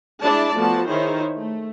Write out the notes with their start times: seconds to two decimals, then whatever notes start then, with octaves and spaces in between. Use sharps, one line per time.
0.23 G#3 D4 E4 G#4 D5 A5
0.57 F3 A3 B3 F#4 A5
0.88 D#3 D#4 E4 G#4 C5 C#5
1.38 A3